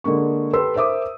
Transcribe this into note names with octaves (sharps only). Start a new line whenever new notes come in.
D3 G#3 A#3 C#6
G4 A4 B4 C6 E6
A#4 C5 E5 D6 D#6